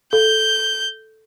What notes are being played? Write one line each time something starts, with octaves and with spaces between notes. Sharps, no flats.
A4 G6